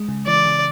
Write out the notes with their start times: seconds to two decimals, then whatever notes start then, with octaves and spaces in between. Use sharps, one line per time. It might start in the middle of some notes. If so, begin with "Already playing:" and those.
Already playing: G#3
0.08 C#3
0.27 E3 D5
0.46 C#3